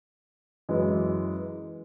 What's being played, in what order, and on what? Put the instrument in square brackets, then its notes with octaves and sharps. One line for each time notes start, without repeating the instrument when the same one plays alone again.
[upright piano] F#2 E3 G#3